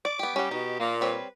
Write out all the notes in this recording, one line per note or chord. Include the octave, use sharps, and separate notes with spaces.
D5 D6
B3 G4
G3 C#4 G4 F#5
B2 D#4
A#2 A#3
G3 C4 B4 C#5